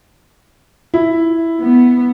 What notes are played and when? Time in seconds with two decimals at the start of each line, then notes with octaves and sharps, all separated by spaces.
0.94 E4
1.61 B3